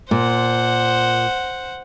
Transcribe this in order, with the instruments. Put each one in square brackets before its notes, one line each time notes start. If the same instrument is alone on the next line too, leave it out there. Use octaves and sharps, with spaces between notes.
[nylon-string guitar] A#2 [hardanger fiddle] C5 F#5